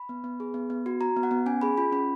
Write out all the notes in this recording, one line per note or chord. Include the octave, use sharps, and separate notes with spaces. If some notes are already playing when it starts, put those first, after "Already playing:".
Already playing: B5
B3
B3
G#4
B3
B3
F#4
F#4 A#5
B3
F#5
B3
C#4 G#5
G#4 B5
F4 B5
C#4 B5